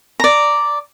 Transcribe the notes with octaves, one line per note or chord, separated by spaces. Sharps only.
D5 A#5